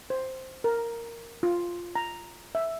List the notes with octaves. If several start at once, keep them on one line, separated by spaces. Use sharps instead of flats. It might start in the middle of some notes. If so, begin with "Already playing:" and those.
C5
A#4
F4
A#5
E5